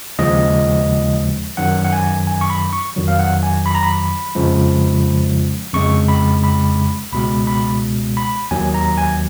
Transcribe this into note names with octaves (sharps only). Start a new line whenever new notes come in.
D#2 C#3 F3 G#3 D#5
F#2 D#3 F#3 F#5
F#5
G#5
G#5
C#6
B5
C#6
F2 D#3 F#3
F5
F#5
G#5
B5
A#5
B5
F2 C#3 F3 G#3
F2 C#3 G#3 C#6
B5
B5
C#2 B2 G#3 B5
B5
B5
D#2 D#3 F#3 G#5
A#5
G#5